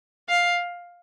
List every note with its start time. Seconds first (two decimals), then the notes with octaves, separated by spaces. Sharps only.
0.29 F5